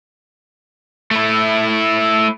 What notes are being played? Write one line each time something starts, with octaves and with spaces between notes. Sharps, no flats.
A3 E4